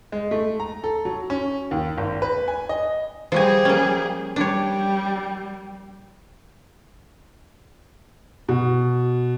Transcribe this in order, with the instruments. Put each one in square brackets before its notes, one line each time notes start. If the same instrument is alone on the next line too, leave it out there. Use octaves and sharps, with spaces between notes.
[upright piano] G#3
A3
A#5
A4
F#3
C#4
D#2
G#1
B4
G#5
D#5
[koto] F3 F#4 G#5 [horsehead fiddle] G3 G#4
[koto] A#3 C#4
[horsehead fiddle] G3 [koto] D4 C#5
[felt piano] B2